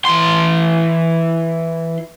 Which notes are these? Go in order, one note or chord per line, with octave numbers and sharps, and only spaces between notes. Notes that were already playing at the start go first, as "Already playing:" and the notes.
E3 C6